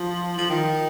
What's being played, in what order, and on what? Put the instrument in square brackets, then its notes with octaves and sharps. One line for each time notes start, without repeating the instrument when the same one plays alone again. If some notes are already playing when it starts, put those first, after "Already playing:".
Already playing: [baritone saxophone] F3
F3
D#3